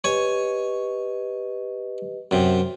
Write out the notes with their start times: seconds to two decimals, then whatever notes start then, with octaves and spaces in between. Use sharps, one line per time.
0.04 G4 B4 C#5 D#5 G#5
2.31 F#2 C3